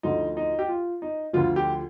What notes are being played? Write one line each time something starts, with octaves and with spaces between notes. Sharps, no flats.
D2 D3 F3 D#4
D#4
G4
F4
D#4
D2 D3 F3 F4
G4